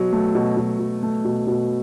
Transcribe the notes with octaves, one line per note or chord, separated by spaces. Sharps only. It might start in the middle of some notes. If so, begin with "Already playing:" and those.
Already playing: B2 F#3
A3
B2
B2
F#3
A3
B2
B2